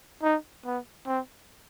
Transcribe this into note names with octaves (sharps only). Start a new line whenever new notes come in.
D#4
B3
C4